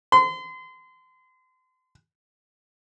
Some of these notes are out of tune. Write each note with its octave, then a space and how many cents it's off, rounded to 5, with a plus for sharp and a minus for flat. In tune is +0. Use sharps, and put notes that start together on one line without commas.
C6 -35